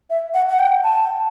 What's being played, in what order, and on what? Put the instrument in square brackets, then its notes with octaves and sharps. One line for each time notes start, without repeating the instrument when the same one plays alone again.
[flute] E5
F#5
F#5
G5
A5